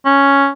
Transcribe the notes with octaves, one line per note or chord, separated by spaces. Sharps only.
C#4